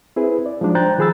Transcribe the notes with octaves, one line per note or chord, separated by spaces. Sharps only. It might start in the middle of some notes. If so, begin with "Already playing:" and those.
C4 E4 G#4 B4
D5
F3 F#3 G#3 D4 D#4
C5 G5 A#5 F#6 G6 A6
D#3 F3 G#4 B5 E6 A6